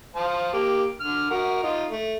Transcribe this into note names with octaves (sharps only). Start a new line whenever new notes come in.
C5 F5 A5
A#3 G4
D3 F6
F#4 A#4
D#4 F4
A3